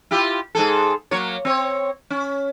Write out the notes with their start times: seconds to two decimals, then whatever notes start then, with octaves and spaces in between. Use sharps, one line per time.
0.11 E4 F4 G4
0.55 G#2 G#4 A4
1.11 F#3 A#3 C#5
1.45 C4 C#5
2.10 C#4